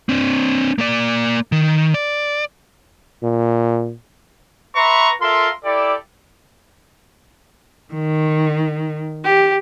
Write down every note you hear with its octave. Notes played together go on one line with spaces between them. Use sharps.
C4 D4
A#3 D5
D#3
D5
A#2
B4 E5 A#5 C6 C#6
F4 A4 A#4 E5 C6
E4 G4 A4 D5
D#3
G4